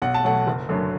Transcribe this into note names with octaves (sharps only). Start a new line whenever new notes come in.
B1 F#5
A5
B2 F#3 A3 F#5
F#1
F#2 D3 F#3 A3